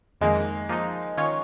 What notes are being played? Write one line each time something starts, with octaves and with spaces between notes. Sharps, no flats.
F2 D#3 G#3 A#3
F3 A#3 D#4
D#3 C#4 F4 C#5